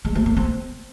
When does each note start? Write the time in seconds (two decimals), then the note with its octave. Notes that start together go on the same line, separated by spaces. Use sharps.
0.05 G#3
0.15 A3
0.26 A3
0.37 C4